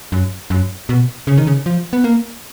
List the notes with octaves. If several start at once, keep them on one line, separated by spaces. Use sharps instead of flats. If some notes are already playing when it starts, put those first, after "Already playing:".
F#2
F#2
B2
C#3
D#3
C#3
F3
B3
A#3